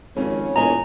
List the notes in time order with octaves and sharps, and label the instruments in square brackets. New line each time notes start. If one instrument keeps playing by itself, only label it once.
[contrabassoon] G#1 [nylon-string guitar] F2 C#3 C#4 [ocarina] C#5
[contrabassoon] E1 [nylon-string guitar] A#2 D#5 G#5 [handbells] A#5